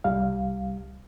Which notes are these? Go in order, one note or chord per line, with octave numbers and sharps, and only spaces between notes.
C2 G3 F5